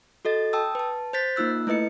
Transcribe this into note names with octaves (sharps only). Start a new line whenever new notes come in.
F#4 A4 D#5 A6
G5 A5 D#6 E6
B4 A5
C5 G6 A6 B6
A#3 D#4 F4 E6 F#6
A3 E4 B4 D#5 C#7